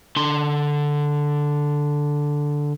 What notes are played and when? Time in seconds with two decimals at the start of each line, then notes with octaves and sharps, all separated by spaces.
0.16 D3 C6